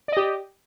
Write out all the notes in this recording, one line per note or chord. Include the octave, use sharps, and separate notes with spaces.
G4 D5 D#5